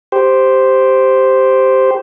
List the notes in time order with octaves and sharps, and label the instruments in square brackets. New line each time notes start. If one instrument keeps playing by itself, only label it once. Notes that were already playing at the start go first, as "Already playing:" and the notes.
[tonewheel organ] G4 C5